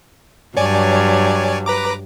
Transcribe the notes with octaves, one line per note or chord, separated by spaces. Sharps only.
G2 F#3 C#5 D5 G#5
B4 A#5 D6